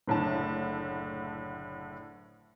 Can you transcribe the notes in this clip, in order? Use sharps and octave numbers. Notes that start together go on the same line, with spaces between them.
F#1 A2 D3 A5